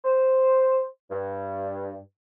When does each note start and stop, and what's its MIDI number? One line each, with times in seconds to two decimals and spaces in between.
0.04 0.85 72
1.11 1.96 43